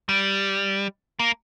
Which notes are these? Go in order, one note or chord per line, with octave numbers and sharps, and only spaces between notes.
G3
A#3